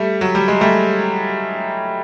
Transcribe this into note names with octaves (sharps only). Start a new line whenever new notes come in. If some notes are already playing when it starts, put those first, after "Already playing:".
Already playing: G3 A3
F#3
G3
G#3
G3 A3